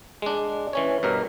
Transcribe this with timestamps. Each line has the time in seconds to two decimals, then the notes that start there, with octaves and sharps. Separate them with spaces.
0.22 G#3 D4
0.73 E3 C#4 C#5
1.03 G2 B2 A#4